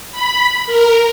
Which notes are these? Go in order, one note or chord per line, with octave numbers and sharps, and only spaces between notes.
B5
A#4